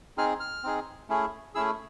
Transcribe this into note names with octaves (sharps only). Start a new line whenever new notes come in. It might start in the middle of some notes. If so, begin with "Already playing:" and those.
C4 D#4 G#4 F6
F6
C4 D#4 G#4
A3 C#4 E4 G#4
A3 C#4 E4 G#4 E6